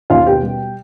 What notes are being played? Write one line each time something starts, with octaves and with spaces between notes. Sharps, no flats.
D#2 F4 F5
B2 G4 G5
G3